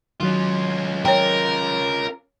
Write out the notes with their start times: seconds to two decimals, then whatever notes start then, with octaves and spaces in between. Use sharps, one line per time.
0.21 D#3 F#3 C#4 F4
1.05 A#4 C#5 G5